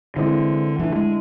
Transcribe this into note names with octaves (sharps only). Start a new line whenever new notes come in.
D3 E3 G#3 C4 E4
D3 E3 A3 E4
G#3